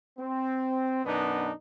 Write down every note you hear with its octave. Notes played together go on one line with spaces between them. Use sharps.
C4
F#2 B2 B3 D4 D#4